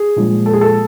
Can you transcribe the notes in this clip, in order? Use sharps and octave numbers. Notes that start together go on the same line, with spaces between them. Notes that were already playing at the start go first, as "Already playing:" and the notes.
Already playing: G#4
A#2 F3 G#3
A4
G#4
A4